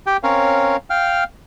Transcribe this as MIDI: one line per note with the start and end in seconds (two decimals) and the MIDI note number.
0.06 0.17 67
0.06 0.17 79
0.23 0.77 60
0.23 0.77 61
0.23 0.77 70
0.23 0.77 73
0.23 0.77 77
0.90 1.24 77
0.90 1.24 79
0.90 1.24 89